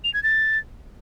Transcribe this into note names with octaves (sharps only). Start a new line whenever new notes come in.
F7
G#6
A6